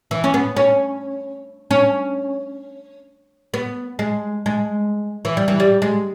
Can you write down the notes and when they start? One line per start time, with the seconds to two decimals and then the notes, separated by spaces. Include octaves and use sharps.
0.11 E3
0.24 C#4
0.34 B3
0.56 C#4
1.71 C#4
3.54 B3
3.99 G#3
4.46 G#3
5.25 E3
5.37 G3
5.48 E3
5.60 G3
5.82 G#3